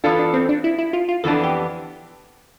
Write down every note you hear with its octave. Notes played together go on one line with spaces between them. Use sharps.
E3 B3 D4 F4 A4
D4
C4
D4
E4
E4
F4
F4
F2 E3 B3 D4 A4
G4